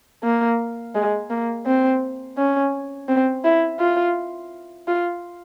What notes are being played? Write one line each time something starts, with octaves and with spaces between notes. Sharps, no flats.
A#3
G#3
A#3
C4
C#4
C4
E4
F4
F4